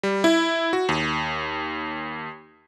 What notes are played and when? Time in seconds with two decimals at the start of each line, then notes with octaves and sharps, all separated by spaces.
0.03 G3
0.24 E4
0.73 F#4
0.89 D#2